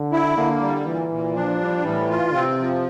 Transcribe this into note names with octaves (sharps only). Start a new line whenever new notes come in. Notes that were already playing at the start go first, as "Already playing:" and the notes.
Already playing: D3
E4
D3 A#3
G3
A#2 E3
A#2
F3 D4
G3
A2 E3
F4
C3 C4
F3